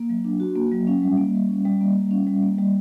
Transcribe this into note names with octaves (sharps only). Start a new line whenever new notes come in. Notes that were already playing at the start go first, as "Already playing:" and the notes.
Already playing: A#3
F#3
D4
F#4
A#3
F#3
C#4
G3
A#3
G3
C#4
G3
A#3
G3
C#4
G3
A#3
G3